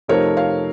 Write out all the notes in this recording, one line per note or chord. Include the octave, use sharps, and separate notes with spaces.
F2 C3 F3 A3 D#4 A#4 C#5
C#5 F5